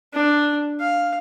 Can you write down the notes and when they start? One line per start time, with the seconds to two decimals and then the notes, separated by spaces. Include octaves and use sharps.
0.13 D4
0.80 F5